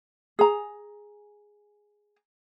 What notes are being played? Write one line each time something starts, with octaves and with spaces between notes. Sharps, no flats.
G#4 A#5